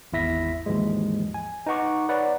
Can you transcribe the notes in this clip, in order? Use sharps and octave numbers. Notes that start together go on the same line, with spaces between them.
G#1 E2 E4 E5 A#6 B6
D#2 G#2 E3 F3 G#3
G#5
D#4 B4 F#5 C#6 D6
B4 C#5 D5 F#5 A#5